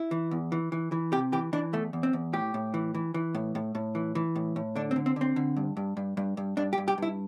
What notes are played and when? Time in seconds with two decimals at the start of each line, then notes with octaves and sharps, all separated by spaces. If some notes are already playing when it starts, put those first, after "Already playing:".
Already playing: E4
0.11 E3
0.31 E2
0.52 E3
0.72 E3
0.92 E3
1.12 C3 G4
1.32 E3 G4
1.53 E3 D4
1.73 E2 A3
1.93 E2
2.03 C4
2.13 E2
2.33 A2 G4
2.54 A2
2.74 E3
2.94 E3
3.14 E3
3.35 A2
3.55 A2
3.75 A2
3.95 E3
4.15 E3
4.36 A2
4.56 A2
4.76 D3 D4
4.91 C4
4.96 D3
5.06 C4
5.16 D3 C4
5.36 D3
5.57 G2
5.77 G2
5.97 G2
6.17 G2
6.37 G2
6.57 G2 D4
6.73 G4
6.78 G2
6.88 G4
6.98 G2 E4